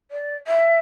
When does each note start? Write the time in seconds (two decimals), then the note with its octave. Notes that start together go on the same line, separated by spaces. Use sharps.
0.11 D5
0.47 E5